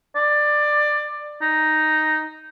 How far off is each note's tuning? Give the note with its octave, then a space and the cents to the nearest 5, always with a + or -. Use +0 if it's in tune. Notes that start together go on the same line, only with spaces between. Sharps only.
D5 +15
D#4 +0